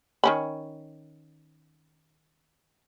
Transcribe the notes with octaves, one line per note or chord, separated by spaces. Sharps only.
D#3 C#4 B5